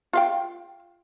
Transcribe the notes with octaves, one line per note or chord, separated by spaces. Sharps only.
F4 F5 G5